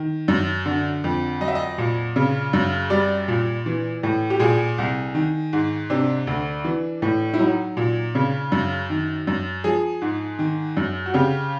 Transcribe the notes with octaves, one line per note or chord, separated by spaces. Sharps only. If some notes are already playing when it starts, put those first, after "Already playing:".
Already playing: D#3
F#2
D3
F2
F#3 D#5
E5
D#5
A#2
C#3
F#2
G3 D5
A#2
E3
A2
G4
A#2 G#4
C2
D#3
G#2
C3 D4
D2
E3
A2
E4
F#3 D#4
A#2
C#3
F#2
D#3
F#2
F3 G#4
G#2
D#3
F#2
F#4
C#3 G4